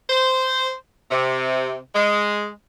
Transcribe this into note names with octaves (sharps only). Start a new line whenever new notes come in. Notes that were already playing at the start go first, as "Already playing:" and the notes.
C5
C3
G#3